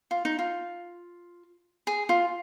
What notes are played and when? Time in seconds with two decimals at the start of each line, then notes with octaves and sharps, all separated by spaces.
0.11 F4
0.25 D#4
0.39 F4
1.87 G#4
2.09 F4